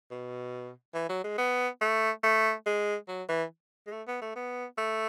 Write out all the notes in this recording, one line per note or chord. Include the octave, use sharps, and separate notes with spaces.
B2
E3
F#3
G#3
B3
A3
A3
G#3
F#3
E3
G#3
A3
B3
A3
B3
A3